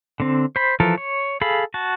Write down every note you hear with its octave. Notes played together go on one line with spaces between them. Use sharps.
D3 C4
C5 B5
E3 F3 A4 A#4
C#5
G#4 A4 F5 B5
F#4 A5